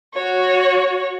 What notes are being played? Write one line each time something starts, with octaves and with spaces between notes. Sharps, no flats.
F#4 C#5